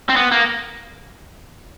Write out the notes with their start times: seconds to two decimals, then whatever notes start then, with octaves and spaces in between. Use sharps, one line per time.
0.09 C4
0.16 B3
0.32 A#3